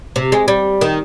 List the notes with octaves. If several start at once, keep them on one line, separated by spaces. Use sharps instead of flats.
C3
G#3
G3
D#3